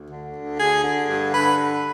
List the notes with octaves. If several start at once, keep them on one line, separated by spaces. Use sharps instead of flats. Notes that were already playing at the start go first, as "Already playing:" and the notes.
Already playing: D2
D3
D2
D3 G#4
D3
G2
D3 B4